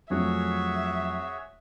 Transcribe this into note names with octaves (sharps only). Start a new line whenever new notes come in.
F2 F#3 A3 F#4 G#4 C#5 E5